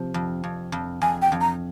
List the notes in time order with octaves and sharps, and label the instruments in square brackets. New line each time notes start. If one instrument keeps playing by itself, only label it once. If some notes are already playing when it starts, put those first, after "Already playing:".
Already playing: [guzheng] C3 F3
F2
F2
F2
[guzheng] F2 [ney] G#5
[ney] G5
[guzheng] F2
[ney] A#5